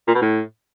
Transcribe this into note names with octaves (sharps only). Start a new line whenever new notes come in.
A#2
B2
A2